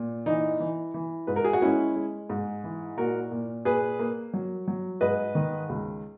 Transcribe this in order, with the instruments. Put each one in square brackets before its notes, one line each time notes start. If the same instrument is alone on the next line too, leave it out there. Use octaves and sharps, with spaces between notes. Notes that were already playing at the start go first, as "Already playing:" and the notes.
Already playing: [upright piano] A#2
E3 D#4
E3
E3
G#2 B4
A#4
G#4
F#4
G#3 C#4 E4
G#3
G#2
E3
A#2 F#4 A#4
A#2
A#2 G#4 B4
A#3
F#3
F#3
G#2 B4 D#5
D#3
C#2